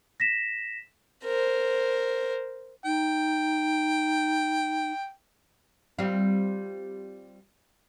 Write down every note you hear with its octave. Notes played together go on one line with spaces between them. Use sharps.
A#6 B6 E7
A#4 C5
D#4 G5
G3 C4 F4